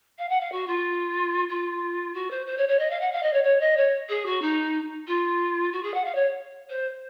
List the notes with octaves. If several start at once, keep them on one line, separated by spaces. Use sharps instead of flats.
F5
F#5
F5
F#4
F4
F4
F#4
C5
C5
C#5
C#5
D#5
F5
F#5
F5
D#5
C#5
C#5
D#5
C#5
G#4
F#4
D#4
F4
F#4
G#4
F#5
F5
C#5
C5